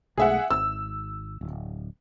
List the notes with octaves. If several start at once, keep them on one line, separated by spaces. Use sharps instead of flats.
B1 G#3 A3 G#4 E5 F#5
G#1 E6
D1